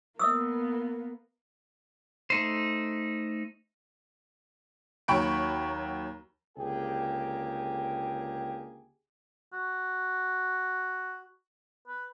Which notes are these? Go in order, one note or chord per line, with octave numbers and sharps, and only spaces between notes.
A#3 B3 D#5 D#6 E6
A3 D#4 C5
D#2 F#3 G5 B5 C#6 D7
C#2 D3 A#3 G4 G#4 G5
F#4
B4